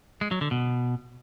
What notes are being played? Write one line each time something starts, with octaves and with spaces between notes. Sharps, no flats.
G#3
F#3
D3
B2